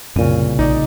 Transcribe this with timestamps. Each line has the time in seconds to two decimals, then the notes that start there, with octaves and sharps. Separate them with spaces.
0.16 C2 F#2 A#2 C#3 D#7
0.59 A#1 D#4 D5 D#5